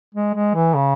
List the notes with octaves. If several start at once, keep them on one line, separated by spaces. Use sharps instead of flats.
G#3
G#3
E3
C#3